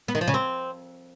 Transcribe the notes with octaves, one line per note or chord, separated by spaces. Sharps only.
B3
D#3
F3
C#3
C4